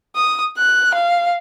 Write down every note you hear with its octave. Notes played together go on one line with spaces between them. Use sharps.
D#6
F#6
F5